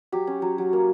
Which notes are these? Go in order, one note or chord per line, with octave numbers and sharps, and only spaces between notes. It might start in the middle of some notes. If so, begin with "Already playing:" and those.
F#3 G4
C#4
F#3
F#3
A#3